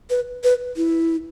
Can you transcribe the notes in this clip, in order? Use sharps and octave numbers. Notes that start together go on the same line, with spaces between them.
B4
B4
E4